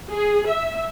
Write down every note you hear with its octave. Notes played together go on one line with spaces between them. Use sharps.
G#4
E5